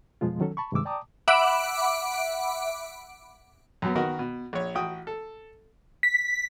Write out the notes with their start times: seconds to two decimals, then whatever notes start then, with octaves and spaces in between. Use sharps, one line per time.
0.21 F2 B2 F3 G#3 F4
0.40 D#3 F#3 C#4 A4
0.57 A5 B5 C#6
0.72 G2 C3 D#3 G#3 D6 E6
0.85 D5 G5 A5 A#5 D6 D#6
1.28 E5 F#5 B5 D6 D7
3.82 F#2 F#3 B3
3.95 D#3 B3 F#4 A#4 D#5
4.19 B2
4.53 A#1 C#5
4.75 A1 F#4 G5 D#6
5.07 A4
6.03 B6